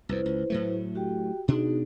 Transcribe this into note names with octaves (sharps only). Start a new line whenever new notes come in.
C2 F2 E4 B4 C5
C#2
A2 F#3 A3
F#4 G4 G5
B2 D4 D#4 F#4 G#4